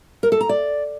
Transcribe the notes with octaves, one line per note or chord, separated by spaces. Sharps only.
A#4
A4
A#5
D5